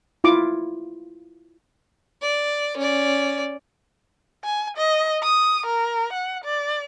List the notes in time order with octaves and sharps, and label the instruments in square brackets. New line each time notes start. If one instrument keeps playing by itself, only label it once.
[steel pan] E4 F4 D6
[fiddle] D5
C#4 D5
[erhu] G#5
D#5
D#6
A#4
F#5
D5